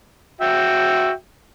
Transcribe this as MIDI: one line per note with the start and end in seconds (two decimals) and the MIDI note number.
0.41 1.11 66
0.41 1.11 76
0.41 1.11 79